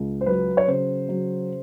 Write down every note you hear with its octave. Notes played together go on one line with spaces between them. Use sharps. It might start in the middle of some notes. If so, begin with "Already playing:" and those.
Already playing: C#2
C5
F#3 B4
C#5
C#3 C5
F#3